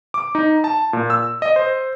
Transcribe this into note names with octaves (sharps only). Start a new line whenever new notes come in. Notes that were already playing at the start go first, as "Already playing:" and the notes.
D6
D#4
A5
A#2
E6
D#5
C5